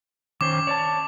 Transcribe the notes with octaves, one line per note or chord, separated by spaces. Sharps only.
D#3 C#4 C5 D6
C#5 D5 A5